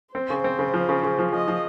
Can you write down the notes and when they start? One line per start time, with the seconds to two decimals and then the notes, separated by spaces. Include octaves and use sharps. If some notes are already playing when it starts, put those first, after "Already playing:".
0.15 C4 C5
0.30 C#3
0.44 C4
0.59 C#3
0.74 F3
0.89 C#3
1.03 C#3
1.19 F3
1.33 F3 D#5
1.48 F3